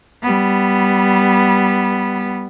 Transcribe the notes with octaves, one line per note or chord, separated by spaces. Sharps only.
G3 B3